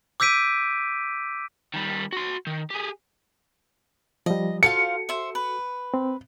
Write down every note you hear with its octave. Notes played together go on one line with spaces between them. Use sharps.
D6 E6 G6 B6 D7 D#7
D#3 G3
F#4 C6
D#3
G4 G#4
F3 G3 D#5
F4 F#4 A4 C5 F5 C#7
C5 E5
B4
C4